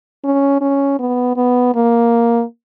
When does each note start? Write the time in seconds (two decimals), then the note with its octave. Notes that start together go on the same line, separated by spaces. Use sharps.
0.24 C#4
0.61 C#4
1.00 B3
1.37 B3
1.75 A#3